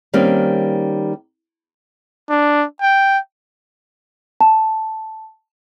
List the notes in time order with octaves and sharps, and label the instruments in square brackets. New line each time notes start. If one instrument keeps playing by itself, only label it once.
[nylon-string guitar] D#3 G3 A#3 C4 C#4
[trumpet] D4
G5
[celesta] A5